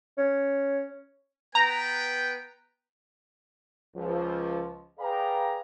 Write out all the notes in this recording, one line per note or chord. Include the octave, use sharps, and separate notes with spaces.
C#4
B3 B4 G5 A#5
C#2 F3
G#4 B4 D5 F5 G5 A#5